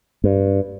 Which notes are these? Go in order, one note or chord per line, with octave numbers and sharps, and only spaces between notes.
G2